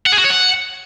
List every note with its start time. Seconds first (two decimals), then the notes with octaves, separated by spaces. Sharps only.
0.07 F#5
0.13 G#4
0.19 F#4
0.25 C#5
0.31 F#5